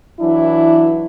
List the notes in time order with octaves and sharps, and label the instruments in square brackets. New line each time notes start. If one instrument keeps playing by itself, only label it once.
[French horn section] E3 F#3 D4 E4